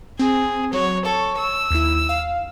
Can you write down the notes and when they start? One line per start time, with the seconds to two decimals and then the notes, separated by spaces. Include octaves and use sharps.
0.19 C4 G#4
0.73 F#3 F#4 C#5
1.05 A4 C#5 C#6
1.37 E6
1.71 D#2 E4
2.09 F5